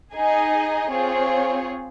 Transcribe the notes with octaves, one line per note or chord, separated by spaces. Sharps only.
D#4 G#4 D#5 G#5
C4 F4 G#4 C#5